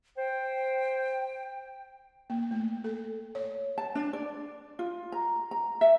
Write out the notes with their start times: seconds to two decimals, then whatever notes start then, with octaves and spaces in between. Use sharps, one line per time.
0.17 C5 G5
2.30 A#3
2.51 A3
2.84 A4
3.35 C#5
3.78 A5
3.95 D4
4.13 D5
4.79 F4
5.12 A#5
5.51 A#5
5.81 E5